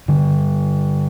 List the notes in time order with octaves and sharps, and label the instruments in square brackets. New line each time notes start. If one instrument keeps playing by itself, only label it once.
[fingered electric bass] D3 G3